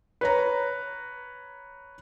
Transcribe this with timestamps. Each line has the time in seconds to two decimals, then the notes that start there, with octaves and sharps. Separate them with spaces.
0.21 B4 C#5 A#5